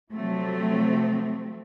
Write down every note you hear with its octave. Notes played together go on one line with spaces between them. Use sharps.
C3 F3 F#3 A3 C4